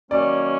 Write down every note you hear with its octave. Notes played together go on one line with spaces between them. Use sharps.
D#3 F#3 A#3 C#4 D5